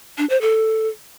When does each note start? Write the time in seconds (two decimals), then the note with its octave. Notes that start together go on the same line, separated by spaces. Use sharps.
0.18 D4
0.30 C5
0.41 A4